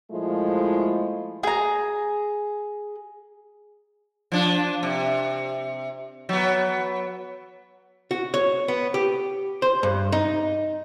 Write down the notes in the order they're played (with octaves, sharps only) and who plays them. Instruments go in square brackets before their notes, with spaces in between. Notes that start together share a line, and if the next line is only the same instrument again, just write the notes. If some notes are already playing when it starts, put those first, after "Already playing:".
[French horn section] A#2 F3 G#3 A3 E4 F4
[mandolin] G#4 A#5
[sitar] F3 D4
C3
F#3 B3
[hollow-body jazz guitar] F#4
C#5
B3
G4
C5
G2
D#4